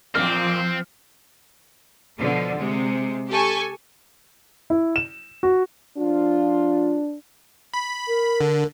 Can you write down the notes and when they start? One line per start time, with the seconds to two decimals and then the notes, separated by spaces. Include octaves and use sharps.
0.15 E2 A#2 F3 A#3 C4 F6
2.18 B2 D3 F3
2.56 C3 G#3
3.29 G4 A4 G#5 C#6
4.70 E4
4.96 E7
5.43 F#4
5.98 F3 D4 F4
7.74 B5
8.08 A#4
8.41 D3